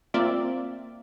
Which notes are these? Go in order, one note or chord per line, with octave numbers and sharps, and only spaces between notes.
A#3 C4 F4 D5 E5